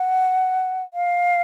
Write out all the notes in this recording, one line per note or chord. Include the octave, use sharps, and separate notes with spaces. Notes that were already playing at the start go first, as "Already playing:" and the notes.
Already playing: F#5
F5